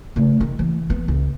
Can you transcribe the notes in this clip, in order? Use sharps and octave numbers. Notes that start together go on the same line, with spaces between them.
C#3 A3
D#3
E3
B3
C#2